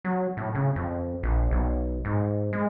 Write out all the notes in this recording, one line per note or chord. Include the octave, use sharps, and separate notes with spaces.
F#3
A2
C#3
F2
A#1
B1
G#2
G#3